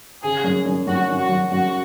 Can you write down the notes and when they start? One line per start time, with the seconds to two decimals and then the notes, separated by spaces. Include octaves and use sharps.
0.23 C#3 G#4
0.44 F#2
0.66 F#2
0.87 F#2 F#4
1.09 F#2
1.19 F#4
1.29 F#2
1.51 F#2 F#4